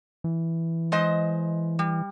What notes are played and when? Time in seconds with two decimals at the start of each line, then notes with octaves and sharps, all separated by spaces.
0.24 E3
0.92 G#3 C5 D#5
1.79 G3